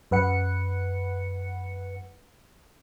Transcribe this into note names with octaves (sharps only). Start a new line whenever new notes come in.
F#2 B4 F#5 C#7